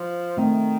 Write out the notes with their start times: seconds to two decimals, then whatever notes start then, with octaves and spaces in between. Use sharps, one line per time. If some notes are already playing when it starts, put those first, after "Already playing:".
Already playing: F3
0.37 D#3 A3 C4